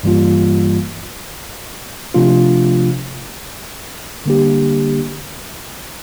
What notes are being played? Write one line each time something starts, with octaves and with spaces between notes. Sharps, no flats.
G2 E3 G3 A#3 F4
C3 F3 A3 D4 F4
D3 G3 A#3 D4 G4